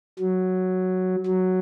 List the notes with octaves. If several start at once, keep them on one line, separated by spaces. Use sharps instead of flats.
F#3
F#3